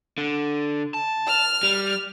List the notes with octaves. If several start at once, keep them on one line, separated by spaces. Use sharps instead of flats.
D3
A5
F6 F7
G3